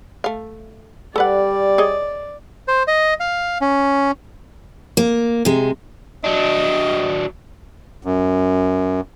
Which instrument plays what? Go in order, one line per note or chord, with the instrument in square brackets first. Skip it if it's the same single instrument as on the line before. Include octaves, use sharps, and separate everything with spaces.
[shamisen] A3 F5
[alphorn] G3 [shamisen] A4 B4 F#5 [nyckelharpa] D5
[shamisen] G#4 C#5 D#5
[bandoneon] C5
D#5
F5
C#4
[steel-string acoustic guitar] A#3
C3 G#3
[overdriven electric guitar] F#3 D4 [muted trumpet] D#5
[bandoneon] F#2